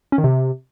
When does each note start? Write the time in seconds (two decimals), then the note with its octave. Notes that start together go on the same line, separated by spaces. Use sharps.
0.12 C#4
0.18 D#3
0.24 C3